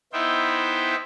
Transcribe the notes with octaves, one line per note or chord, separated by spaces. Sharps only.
B3 D#4 E4 C5 E5 G5